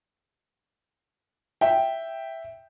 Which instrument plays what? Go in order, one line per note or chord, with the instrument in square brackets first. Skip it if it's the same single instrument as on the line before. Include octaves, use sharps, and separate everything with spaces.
[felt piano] E5 G5